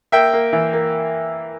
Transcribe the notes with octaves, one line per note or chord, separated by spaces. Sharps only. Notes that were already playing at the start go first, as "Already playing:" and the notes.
A#3 E5 G5
A#3
E3
A#3